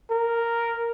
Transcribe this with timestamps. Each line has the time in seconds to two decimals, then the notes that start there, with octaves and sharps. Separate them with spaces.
0.10 A#4